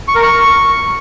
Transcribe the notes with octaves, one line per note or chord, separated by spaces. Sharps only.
C#6
A#4
C#6